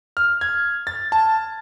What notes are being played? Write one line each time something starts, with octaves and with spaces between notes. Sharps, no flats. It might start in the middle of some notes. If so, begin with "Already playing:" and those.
F6
G#6
A6
A5